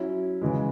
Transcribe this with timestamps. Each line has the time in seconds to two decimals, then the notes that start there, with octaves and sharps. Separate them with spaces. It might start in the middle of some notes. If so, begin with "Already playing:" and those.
Already playing: F#3 C#4 E4
0.41 C#3 E3 G#3